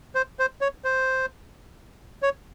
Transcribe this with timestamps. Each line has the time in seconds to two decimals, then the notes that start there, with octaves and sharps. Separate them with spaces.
0.15 C5
0.39 C5
0.61 C#5
0.84 C5
2.22 C#5